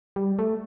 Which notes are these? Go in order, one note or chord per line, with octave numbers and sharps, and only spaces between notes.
G3
A3